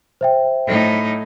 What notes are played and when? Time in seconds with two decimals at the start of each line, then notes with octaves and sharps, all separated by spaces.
0.21 C5 E5 G5
0.66 A2 D#4